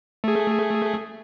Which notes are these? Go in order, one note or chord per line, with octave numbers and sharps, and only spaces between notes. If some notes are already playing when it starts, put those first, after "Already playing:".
A3 G#4